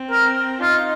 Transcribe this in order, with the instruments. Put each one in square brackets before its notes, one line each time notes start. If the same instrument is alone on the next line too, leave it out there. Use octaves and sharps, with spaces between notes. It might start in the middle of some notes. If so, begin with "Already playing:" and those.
Already playing: [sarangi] C4
[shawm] A#4
[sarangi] D#4 [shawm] F4